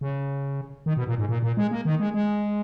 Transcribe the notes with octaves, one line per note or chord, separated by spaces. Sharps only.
C#3
D#3
B2
A#2
G#2
A#2
A#2
G#3
A#3
D#3
G#3
G#3